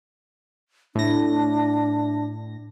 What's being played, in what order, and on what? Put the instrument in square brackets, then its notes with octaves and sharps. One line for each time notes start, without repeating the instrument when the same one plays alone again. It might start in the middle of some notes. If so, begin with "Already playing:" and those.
[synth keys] A2 A#6 [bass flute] D4